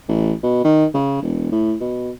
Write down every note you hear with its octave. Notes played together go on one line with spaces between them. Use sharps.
A1
B2
D#3
C#3
E1
A2
B2